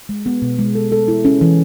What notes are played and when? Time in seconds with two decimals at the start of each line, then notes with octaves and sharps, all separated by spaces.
0.09 G#3
0.26 B3
0.42 B2
0.59 G#3
0.75 A4
0.92 A4
1.08 E4
1.25 C#4
1.41 E3